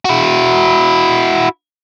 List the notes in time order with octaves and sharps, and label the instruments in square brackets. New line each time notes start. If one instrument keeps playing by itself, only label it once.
[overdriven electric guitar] E4 F#4